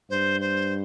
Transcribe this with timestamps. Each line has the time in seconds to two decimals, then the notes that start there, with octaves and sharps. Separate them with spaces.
0.10 G2 C5
0.41 C5